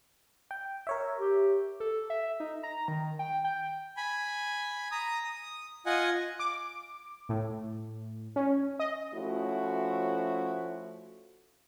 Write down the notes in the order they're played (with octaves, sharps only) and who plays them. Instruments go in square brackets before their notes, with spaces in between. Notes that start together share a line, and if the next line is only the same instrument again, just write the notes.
[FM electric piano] G5
A#4 C#5 E5
[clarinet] G4
[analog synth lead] A4
E5
D#4
A#5
D#3
G5
G5
[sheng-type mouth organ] G#5 B5
A#5 D#6
D#6
F4 D#5 F#5 G#5
[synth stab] D6
A2
C#4
D#5
[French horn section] F3 A3 C#4 E4 F#4